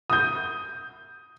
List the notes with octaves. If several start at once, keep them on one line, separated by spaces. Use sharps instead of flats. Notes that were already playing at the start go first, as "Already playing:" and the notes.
D#6 G6